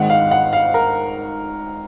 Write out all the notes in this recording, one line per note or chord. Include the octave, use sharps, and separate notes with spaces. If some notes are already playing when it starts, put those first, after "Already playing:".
Already playing: G#1 G#2 D#3 F#5
F5
F#5
F5
A#4